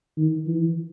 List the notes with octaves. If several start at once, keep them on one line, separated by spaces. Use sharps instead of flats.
D#3
E3